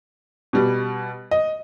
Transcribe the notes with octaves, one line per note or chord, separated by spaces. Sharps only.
B2 G3
D#5